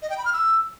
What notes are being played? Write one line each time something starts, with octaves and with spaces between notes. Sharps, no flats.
D#5
G5
B5
F6
E6